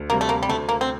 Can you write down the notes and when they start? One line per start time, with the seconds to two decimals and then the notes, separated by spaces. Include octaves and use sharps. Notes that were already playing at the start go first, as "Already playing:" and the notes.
Already playing: D2
0.10 C3 G3 A#3
0.21 A3
0.29 A#3
0.43 G3
0.49 D2 A3
0.69 A#3
0.81 C4